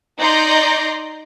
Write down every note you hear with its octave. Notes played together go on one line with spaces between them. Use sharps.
D#4 D5 A#5 C6 G6 A#6